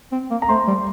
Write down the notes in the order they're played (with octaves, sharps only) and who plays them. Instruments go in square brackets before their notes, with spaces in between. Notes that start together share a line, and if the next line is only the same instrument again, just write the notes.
[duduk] C4
A#3
[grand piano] A#5
[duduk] A3 [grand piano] C5 C6
[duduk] G3